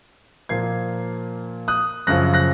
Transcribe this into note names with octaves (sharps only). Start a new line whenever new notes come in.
A#2 F3 A#3 G#6 C7
D#6 F#6
F#2 C#3 F3 F#6 A#6
F#6 A#6